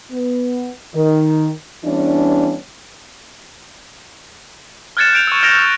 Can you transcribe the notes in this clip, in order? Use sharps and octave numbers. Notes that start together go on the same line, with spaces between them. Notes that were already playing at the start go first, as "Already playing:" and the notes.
B3
D#3
E3 G3 B3 C#4 D4
F6 F#6 G#6 A6 C#7 E7
G6 D7 F7
C#6 E6
F6 G#6 A#6 D7 F7
E6